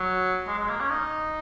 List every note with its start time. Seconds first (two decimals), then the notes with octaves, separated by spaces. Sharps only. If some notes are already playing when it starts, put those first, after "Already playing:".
Already playing: F#3
0.47 G#3
0.59 G#3
0.69 A#3
0.80 C#4
0.91 D#4